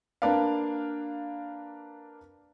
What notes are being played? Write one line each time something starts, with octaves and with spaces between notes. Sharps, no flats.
A#3 D4 B4 D5 F5